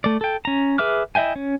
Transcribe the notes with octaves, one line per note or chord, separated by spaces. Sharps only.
A3 D5
A4 G5
C#4 A#5
G#4 B4 E5 D6 F6
E4 D#5 E5 G5 G#5
C#4